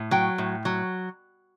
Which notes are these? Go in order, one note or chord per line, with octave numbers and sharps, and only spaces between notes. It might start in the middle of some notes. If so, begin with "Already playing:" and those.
Already playing: A2
F#3 G5
A2
F#3